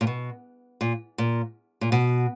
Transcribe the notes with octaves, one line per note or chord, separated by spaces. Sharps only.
A#2
B2
A#2
A#2
A#2
B2